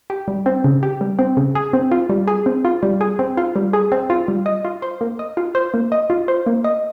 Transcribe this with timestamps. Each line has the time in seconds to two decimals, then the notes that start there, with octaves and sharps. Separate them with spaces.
0.10 G4
0.28 G3
0.46 C4
0.64 C#3
0.83 G4
1.01 G3
1.19 C4
1.37 C#3
1.55 G#4
1.73 C4
1.92 F4
2.10 G3
2.28 G#4
2.46 C4
2.65 F4
2.83 G3
3.01 G#4
3.19 C4
3.37 F4
3.56 G3
3.73 G#4
3.92 C4
4.10 F4
4.28 G3
4.46 D#5
4.65 F4
4.82 C5
5.01 A#3
5.19 D#5
5.37 F4
5.55 C5
5.74 A#3
5.92 D#5
6.10 F4
6.28 C5
6.47 A#3
6.64 D#5